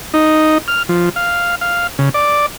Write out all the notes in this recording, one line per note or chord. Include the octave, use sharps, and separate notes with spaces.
D#4
F6
F3
F5
F5
C#3
D5